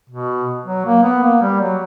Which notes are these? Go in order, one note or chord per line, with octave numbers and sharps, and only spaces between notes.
B2
F#3
A#3
B3
A#3
G3
F#3